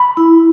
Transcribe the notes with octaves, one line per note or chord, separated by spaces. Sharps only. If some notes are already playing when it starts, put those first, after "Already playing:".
Already playing: B5
E4